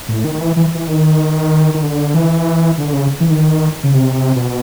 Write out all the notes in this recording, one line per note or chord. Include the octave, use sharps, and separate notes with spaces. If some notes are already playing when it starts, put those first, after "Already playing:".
A2
D#3
E3
E3
E3
D#3
D#3
D3
E3
D3
C#3
E3
D#3
C#3
C3
B2